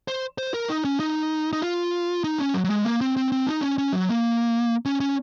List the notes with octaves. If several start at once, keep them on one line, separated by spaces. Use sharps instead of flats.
C5
C5
A#4
D#4
C#4
D#4
D#4
F4
D#4
C#4
F#3
F#3
G#3
A#3
C4
C4
C4
D#4
C#4
C#4
F#3
A#3
C#4
C#4